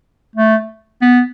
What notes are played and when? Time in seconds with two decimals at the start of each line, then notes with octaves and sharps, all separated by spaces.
0.36 A3
1.01 B3